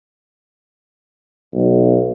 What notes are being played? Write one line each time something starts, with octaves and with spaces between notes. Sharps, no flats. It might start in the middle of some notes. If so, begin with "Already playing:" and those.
B1